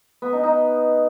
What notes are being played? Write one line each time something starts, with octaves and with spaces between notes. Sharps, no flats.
B3
D#4
D#4